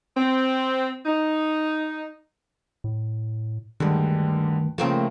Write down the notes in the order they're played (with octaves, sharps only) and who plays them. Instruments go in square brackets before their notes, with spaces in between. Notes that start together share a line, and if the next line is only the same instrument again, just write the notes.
[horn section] C4
D#4
[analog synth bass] A2
[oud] D2 G2 [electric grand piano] D3 G3 G#3 [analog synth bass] D#3
[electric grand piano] C#3 F3 [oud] A3 A#3 C4